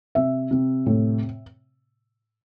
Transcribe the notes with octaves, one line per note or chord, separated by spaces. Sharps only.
C3 E5
C3
A2